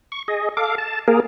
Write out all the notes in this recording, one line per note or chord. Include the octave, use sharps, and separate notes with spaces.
C#6
G#4 D#5
A4 F5 D6
A5
A#3 G#4 A#4